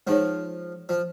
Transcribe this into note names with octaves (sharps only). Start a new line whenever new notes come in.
F3 G#3 D#4 G#4 C#5
F3